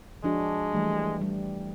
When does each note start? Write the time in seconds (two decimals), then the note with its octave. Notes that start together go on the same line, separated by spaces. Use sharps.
0.24 F3 G#3 D4 F#4
0.73 E3 G3 A3
1.21 G3